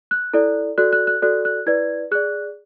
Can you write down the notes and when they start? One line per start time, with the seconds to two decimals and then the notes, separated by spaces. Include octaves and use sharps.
0.11 F#6
0.34 E4 A4 D5
0.78 F#4 A4 D5 F#6
0.93 F#6
1.07 F#6
1.22 F#4 A4 D5 F#6
1.45 F#6
1.66 E4 B4 D5 G#6
2.11 G#4 D5 F#6